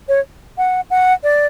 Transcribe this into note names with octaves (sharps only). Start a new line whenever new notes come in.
C#5
F#5
F#5
D5